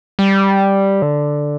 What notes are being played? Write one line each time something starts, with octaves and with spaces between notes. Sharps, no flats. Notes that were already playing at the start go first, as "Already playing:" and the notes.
G3
D3